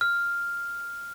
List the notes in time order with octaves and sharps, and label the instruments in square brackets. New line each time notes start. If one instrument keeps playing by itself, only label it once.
[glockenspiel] F6